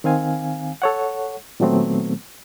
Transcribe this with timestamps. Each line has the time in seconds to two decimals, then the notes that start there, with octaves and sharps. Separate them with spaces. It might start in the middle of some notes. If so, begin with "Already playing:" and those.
0.04 D#3 C4 F5 G#5
0.82 A4 C#5 F#5
1.60 A#2 D#3 F#3 A3 B3 C4